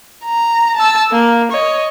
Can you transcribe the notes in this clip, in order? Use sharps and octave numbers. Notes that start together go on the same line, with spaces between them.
A#5
A5 E6
A#3
C#5 D#5